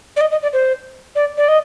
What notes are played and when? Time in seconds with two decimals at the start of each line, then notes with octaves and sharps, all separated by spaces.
0.16 D5
0.21 D#5
0.31 D#5
0.43 D5
0.53 C5
1.15 D5
1.37 D5
1.48 D#5